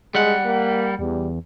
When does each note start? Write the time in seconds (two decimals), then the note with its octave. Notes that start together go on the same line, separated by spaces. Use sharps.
0.15 G3 G#3 F#5
0.45 A#3
0.99 E2 G3